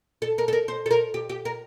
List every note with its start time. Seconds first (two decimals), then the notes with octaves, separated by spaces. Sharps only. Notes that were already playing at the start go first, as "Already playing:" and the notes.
0.22 A4
0.38 A#4
0.48 A4
0.53 A#4
0.68 C5
0.86 A4
0.91 A#4
1.14 G4
1.29 G4
1.45 A#4